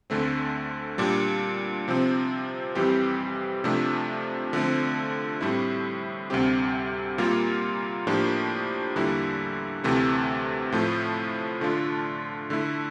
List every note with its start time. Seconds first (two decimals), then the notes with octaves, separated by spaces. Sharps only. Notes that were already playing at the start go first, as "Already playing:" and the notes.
0.10 D2 D3 A3 C4
0.98 A#2 G3 D4
1.88 C3 F3 C4
2.75 F2 E3 G3 C4 G4
3.64 C3 F3 A3 D4
4.53 D3 F3 A3 C4
5.41 A2 G3 C4 E4
6.30 D2 C3 G3 C4 G4
7.18 A#2 G3 A#3 F4
8.07 A2 F3 A#3 D4 G4
8.96 E2 D3 G3 A#3 E4
9.84 D2 C3 E3 A3 C4
10.72 A2 F3 A3
11.61 D3 A3 D4 F4
12.50 D3 A3 E4